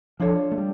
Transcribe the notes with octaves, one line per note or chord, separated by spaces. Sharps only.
F3 D4 F4 A4 C#5
A3
G3